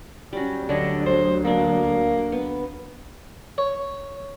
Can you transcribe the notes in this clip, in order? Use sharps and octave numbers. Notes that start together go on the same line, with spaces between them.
F#3 G3 C#4
D2 D3 F#3 D4 C#5 D#5
C5
A#3 D4 A4
B3
C#5